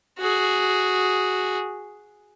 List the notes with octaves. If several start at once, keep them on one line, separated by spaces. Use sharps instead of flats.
F#4 G#4